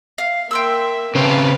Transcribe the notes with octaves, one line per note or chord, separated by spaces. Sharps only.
F5
A#3 E5 G5 C6 E6
C#3 C4 B4 F5 A5